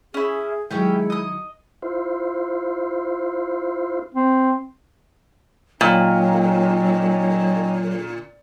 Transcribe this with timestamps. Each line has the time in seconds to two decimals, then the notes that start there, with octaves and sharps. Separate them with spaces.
0.14 C#4 E4 G#4
0.71 D#3 F#3 G#3 C#4 E4 G4 G5
1.10 D#5 D#6
1.82 E4 F4 C5
4.14 C4
5.81 A#2 F#3 C#4 D#4 G5